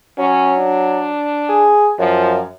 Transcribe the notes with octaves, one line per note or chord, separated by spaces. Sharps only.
F#3 C#4
D4
G#4
F#2 F3